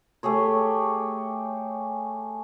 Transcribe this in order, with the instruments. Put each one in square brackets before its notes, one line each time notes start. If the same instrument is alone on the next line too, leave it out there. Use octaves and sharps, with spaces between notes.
[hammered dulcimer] A3 G4 G#4 C#5